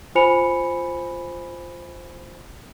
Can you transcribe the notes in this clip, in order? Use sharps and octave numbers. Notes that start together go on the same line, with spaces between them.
F4 C5 G#5 B5 C#7 F7